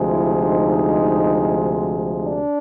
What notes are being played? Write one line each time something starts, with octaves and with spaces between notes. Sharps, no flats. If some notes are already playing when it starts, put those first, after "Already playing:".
Already playing: D2 C3 F3 G#3
E4
D#4
D4